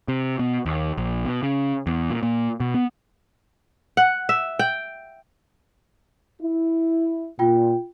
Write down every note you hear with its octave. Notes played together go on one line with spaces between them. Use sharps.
C3
B2
D#2
A#1
B2
C#3
E2
A#2
A#2
B2
B3
F#5
E5
G5
E4
A#2 F4 G5